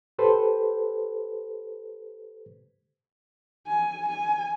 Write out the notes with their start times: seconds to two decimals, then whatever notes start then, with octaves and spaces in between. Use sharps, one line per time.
0.19 G4 A4 B4 C5
3.67 G#5
4.08 G#5